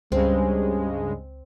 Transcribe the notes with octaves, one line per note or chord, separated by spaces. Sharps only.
C#2 G2 C#3 G3 G#3 C4